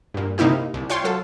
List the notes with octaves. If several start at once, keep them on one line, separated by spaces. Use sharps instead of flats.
G2 A#2
C3 A#3 D#4 E4 G4
C2
F4 C#5 G5 C6
F#3 F4 A4